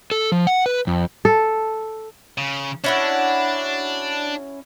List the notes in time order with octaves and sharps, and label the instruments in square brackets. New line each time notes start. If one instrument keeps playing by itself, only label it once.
[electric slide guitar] A4
F3
F#5
B4
F2
[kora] A4
[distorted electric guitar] C#3
[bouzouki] C#4 E4 F#4 [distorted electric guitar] D4